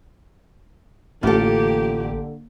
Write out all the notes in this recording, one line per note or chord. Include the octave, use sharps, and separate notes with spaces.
A1 D3 A#3 F4 G4 A4